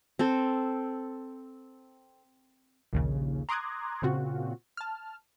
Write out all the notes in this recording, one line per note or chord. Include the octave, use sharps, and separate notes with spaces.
C4 A4
A#1 D#2 C#3
A#5 C6 D6 D#6 F#6 G#6
A#2 C#3 C4 F4 F#4
A5 F6